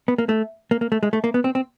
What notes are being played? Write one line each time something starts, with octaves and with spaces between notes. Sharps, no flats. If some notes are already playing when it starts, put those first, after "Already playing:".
B3
A#3
A3
A#3
A#3
A3
G#3
A3
A#3
B3
C4
C4